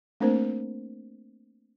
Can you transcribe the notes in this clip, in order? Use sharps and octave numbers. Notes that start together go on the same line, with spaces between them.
A3 A#3 C4 D4 A#4 C5